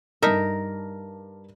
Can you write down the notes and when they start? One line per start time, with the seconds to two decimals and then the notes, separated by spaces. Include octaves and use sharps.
0.22 G2 D#4 A#4 E5 A5